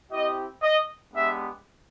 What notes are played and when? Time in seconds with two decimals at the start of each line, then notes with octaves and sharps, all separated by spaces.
0.11 C4 E4 G4 D#5
0.63 D#5
1.14 G#3 B3 D4 G4 E5